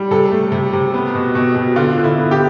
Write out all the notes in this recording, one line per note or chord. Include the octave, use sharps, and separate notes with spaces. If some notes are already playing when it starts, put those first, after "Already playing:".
Already playing: G3
C3 A4
A3
C3
C3
B3
B2
B2
B2
D3 F4
D3
E4
B3
G4